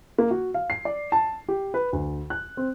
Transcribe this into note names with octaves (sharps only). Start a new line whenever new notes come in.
A#3
F#4
F5
C7
D5
A5
G4
B4
D2
F#6
C4